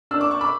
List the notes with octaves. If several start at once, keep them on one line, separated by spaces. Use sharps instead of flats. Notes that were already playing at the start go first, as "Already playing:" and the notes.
D4 E6
D6
C#6
B5 D6